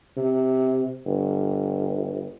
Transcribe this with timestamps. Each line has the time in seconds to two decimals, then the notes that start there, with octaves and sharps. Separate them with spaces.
0.17 C3
1.05 G1